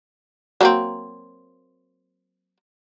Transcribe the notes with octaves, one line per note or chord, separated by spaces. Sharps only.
F#3 A#3 C4